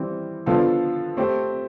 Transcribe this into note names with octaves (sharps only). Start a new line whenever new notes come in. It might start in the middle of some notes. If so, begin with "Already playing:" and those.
Already playing: E3 G3 C4
D3 F3 B3 F4 A4
A3 C4 G4